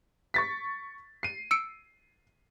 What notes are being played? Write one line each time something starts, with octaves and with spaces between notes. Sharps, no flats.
C#6 A6 B6
C7 D#7
E6 C#7 D7